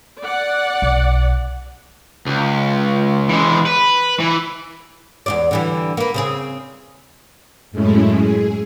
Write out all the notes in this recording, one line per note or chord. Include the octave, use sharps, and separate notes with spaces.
D5 F#5
B1
C#2
E3 G#3
B4
E3
E2 A#2 D5
D3 E3 G3
A#3 B4
C#3 C4 G#4
F#2 A2 G#3 A3 C#4 E4
G#4